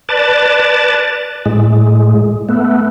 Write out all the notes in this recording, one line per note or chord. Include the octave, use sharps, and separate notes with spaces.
B4 D5 A5
A2 G#3
A3 B3